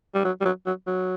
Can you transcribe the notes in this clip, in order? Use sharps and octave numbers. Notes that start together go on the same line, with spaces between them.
G3
F#3
G3
F#3
F#3
F#3